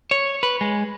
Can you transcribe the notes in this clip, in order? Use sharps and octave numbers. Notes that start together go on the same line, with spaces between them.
C#5
B4
G#3